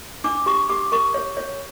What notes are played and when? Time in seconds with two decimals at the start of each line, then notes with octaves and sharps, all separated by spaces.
0.24 D4 D6
0.46 G4 C#6
0.69 G4 D6
0.92 A#4 C#6
1.14 C#5
1.37 C#5